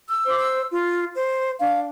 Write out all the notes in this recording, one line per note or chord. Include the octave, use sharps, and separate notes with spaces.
E6
C5 D6
E6
F4
C5
D4 F5